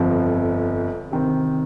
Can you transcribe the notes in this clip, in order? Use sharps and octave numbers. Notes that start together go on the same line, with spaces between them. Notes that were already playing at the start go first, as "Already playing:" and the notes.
Already playing: G1 F2 F3
C3 D#3 C4